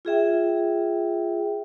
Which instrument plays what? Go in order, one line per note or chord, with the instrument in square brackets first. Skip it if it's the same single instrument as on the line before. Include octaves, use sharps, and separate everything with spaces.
[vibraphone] F4 G#4 E5 G5